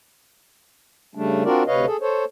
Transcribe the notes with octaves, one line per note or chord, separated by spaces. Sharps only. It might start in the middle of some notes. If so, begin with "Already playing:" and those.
C#3 G3 A3 D4
C4 D4 F4 F#4 A#4 D5
D2 C3 B4 C#5 D#5 F5
G#4 A4
A4 C5 C#5